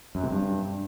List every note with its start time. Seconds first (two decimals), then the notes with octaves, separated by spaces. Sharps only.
0.15 F#2
0.23 C3
0.31 G2